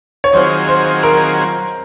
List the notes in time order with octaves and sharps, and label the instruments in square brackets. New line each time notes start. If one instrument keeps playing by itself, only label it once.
[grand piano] C#5
[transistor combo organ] D#3 F#3 C4 F4 G#4 [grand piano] C5
[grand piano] C5
A#4